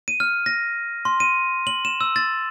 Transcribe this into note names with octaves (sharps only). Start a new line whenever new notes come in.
D#7
F6
A#6
C6
D#7
F#7
E7
E6
A6